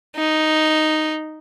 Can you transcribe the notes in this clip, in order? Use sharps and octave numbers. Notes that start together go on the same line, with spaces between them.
D#4